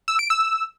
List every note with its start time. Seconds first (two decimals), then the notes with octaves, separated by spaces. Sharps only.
0.08 E6
0.19 D7
0.30 E6